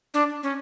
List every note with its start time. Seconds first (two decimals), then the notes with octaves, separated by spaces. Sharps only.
0.14 D4
0.43 C#4